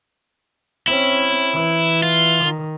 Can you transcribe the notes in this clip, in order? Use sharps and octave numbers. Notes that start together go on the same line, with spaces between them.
C4 C#4 E4
E3
F4
D#3